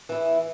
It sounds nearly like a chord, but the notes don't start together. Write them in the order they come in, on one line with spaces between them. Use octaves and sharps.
E3 E4 G#4